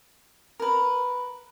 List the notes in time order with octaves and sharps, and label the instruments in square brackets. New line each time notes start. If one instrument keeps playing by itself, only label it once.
[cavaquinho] A#4 B4